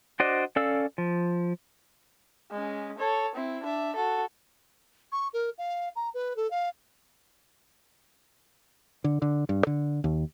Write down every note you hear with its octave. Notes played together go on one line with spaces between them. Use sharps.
D4 F#4 C5 D5 D#5
C#4 A4 D5 F5 E6
F3
G#3 C#4
A4 C#5
C4 E4
D4 E5
F#4 A4
C#6
A#4
F5
A#5
B4
A4
F5
D3
D3
G2
D3
D#2